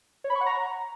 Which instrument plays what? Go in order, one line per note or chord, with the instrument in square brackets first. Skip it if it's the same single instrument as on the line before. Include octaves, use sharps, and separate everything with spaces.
[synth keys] C#5
B5
C#6
F#5
A#5